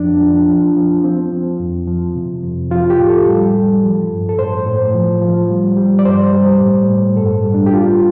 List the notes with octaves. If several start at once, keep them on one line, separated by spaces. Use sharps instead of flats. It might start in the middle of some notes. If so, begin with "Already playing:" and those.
Already playing: F2 F3 D4
F3
F3
F3
F3 C4
F3
F2
F3
C3
F2
F3 F4
G4
A2
A4
G3
G3
F3
G2
A4
A2 C5
A2
F3
F3
G3
G3
D5
G2 C5
G3
A2
A2
G2 A4
G3
D4
G4
G3 F4